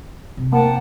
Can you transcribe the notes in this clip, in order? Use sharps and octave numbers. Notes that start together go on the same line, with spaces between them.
C3
A#3 F#5 G5 A5